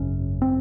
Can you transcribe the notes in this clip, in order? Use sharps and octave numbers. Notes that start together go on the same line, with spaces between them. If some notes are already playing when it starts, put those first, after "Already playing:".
Already playing: G#1 F#2 C#3 C#4
C4